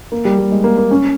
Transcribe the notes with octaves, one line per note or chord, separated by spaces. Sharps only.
A#3
G3
G3
G#3
A#3
A#3
C#4